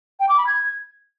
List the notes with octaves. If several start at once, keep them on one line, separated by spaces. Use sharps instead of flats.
G5
D6
B5
G#6